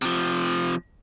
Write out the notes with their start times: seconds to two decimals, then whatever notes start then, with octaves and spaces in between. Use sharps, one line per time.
0.02 C3 F3